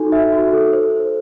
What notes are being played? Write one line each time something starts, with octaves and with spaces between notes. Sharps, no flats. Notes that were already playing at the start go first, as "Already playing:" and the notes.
Already playing: D#4 F#4 A4
E5
F#4
A4
C5
C5